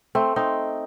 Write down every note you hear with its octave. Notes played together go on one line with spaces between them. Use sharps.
A3 C4
C4 D#4